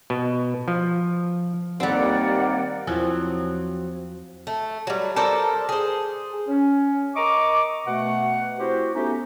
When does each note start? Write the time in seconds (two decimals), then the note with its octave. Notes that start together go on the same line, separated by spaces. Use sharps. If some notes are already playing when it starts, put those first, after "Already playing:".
0.10 B2
0.68 F3
1.80 D#2 G3 A#3 C4 D5 F#5
2.87 E2 F3 F#3 C4 E4 F4
4.47 A3
4.87 F#3 G3
5.16 A4 A#4 C5 D5
5.69 G#4 C5
6.47 C#4
7.15 A#4 D#5 A#5 C#6 D6
7.87 B2 A3 F#5
8.59 C4 E4 F#4 G4 C5
8.94 A3 B3 C#4 D#4 F#4 G4